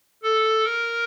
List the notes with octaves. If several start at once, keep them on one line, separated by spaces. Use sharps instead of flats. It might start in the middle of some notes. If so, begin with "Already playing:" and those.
A4
A#4